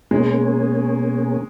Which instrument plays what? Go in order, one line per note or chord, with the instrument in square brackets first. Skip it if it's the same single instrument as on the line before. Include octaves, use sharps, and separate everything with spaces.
[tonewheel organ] B2 A#3 C#4 G#4 [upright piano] G#3